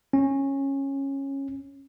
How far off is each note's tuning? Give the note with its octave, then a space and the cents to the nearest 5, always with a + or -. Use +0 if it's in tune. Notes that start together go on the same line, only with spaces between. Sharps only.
C#4 -15